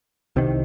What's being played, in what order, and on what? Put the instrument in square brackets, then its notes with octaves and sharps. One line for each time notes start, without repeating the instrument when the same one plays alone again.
[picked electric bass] C2 C3 D#3